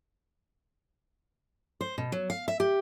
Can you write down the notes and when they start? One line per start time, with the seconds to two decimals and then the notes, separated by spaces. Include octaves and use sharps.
1.81 C5
1.98 B2
2.12 F#3
2.30 F5
2.48 E5
2.60 G4